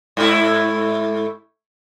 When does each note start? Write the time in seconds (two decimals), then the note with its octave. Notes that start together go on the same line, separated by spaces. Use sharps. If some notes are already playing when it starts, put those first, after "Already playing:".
0.17 G#2 A3 E4